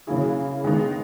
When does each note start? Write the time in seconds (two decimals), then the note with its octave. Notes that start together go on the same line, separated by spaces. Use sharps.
0.07 C#3 F#3 A#3 E4 G#4
0.64 D#3 G#3 B3 D#4